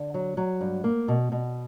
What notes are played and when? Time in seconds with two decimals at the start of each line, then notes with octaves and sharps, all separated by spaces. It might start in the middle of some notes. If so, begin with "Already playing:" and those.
Already playing: D3
0.14 F#3
0.37 F#3
0.61 G2
0.84 A#3
1.08 B2
1.32 B2